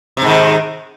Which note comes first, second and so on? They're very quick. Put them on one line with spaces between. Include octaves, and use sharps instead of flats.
C3 G#2 D#3